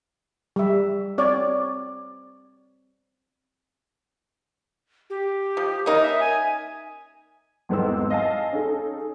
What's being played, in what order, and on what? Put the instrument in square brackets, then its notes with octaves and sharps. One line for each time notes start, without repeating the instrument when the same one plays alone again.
[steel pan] G3 E5
C4 C#5 D5
[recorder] G4
[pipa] F3
[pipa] A#3 C#4 D#4 [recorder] A#4
[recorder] E5
G#5
[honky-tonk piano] G#1 E2 G#2 B3 C4 E6
D#5 F5 G#5 A5
C#4 D#4 G#4 A4